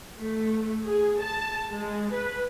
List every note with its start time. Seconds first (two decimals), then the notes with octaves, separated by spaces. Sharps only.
0.20 A3
0.86 G#4
1.20 A5
1.71 G#3
2.13 B4